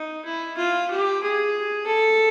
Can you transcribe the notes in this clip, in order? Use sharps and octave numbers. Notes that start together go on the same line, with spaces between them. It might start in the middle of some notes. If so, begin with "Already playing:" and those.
Already playing: D#4
E4
F4
G4
G#4
A4